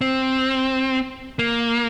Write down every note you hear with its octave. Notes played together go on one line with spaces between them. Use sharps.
C4
A#3